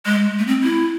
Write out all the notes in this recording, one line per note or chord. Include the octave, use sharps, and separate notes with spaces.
G#3
A3
C4
E4